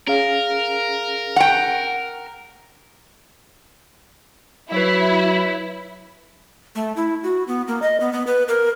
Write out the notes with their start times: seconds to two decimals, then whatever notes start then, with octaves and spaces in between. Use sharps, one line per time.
0.07 C#4 G#4 A#4 F5
1.36 F#5 G5
4.72 F#3 E4 B4 C#5 E5
6.75 A3
6.96 E4
7.23 F#4
7.48 B3
7.68 A#3
7.82 D#5
8.00 B3
8.13 B3
8.27 B4
8.48 A#4